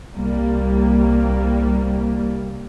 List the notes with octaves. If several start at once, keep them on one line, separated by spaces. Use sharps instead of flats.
C2 G3 A#3